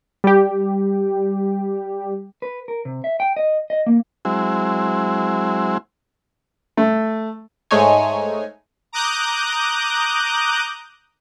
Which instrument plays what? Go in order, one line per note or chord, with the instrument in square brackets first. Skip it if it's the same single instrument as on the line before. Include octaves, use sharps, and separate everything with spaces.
[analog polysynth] G3 G4
[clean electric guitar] B4
A#4
C3
E5
G5
D#5
D#5
A#3
[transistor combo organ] F#3 G#3 C4 E4
[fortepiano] A3
[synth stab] G#2 G#3 A3 D#4 C#5 G#5
[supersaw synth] A#5 D6 D#6 F#6 G6